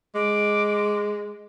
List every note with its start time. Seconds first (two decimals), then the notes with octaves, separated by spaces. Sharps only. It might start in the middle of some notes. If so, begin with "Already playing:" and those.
0.15 G#3 D6